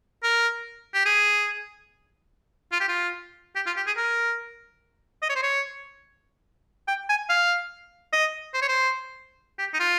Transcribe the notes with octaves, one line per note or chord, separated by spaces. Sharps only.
A#4
G4
G#4
F4
G4
F4
G4
F4
G4
G#4
A#4
D#5
C#5
C5
C#5
G5
G#5
F5
D#5
C5
C#5
C5
G4
D#4
F4